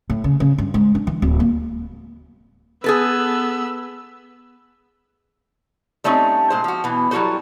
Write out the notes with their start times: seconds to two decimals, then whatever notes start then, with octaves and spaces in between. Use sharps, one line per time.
0.10 A2
0.24 C#3
0.40 C#3
0.58 G2
0.74 G#2
0.95 D4
1.07 E3
1.22 D1
1.40 A#3
2.84 B3 G#4 A4 B4 E6
6.04 G3 A3 C4 C#4 D#4
6.50 A#2 G#3 C5
6.64 F3 F#4
6.84 B2 E3
7.11 F#3 G3 E4 F#4 A4 C5